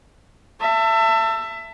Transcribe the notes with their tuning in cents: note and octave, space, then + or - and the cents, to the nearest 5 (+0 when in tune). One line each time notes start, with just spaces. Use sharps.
E5 +20 A5 +30